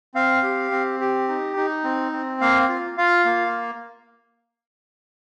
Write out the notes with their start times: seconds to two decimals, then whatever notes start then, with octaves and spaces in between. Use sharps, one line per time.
0.15 C4 F5
0.43 G4
0.71 C4
1.00 G4
1.28 D#4
1.57 D#4
1.84 C4
2.12 C4
2.41 A#3 F5
2.69 F4
2.97 F4 F5
3.25 A#3